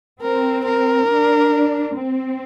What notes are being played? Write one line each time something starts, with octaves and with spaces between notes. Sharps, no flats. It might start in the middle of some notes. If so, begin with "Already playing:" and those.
C4 A#4
A#4
D4
C4